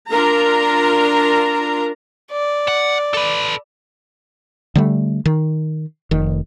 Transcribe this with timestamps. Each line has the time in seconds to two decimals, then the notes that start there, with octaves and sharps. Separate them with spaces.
0.12 D4 F4 A#4 A#5
2.32 D5
2.68 F#5
3.14 A4 B4
4.75 D3 G3 A3
5.26 D#3
6.11 F1 D#3